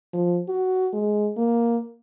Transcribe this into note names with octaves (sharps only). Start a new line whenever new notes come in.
F3
F#4
G#3
A#3